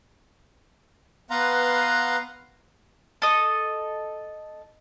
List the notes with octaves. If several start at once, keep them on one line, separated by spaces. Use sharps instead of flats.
B3 B4 F5 F#5 A#5 C6
A4 D#5